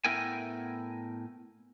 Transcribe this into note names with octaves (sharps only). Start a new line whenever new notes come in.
A2 B3 E4 A#4 G5 G#5